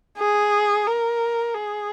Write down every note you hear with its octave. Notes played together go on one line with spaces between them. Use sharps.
G#4
A#4
G#4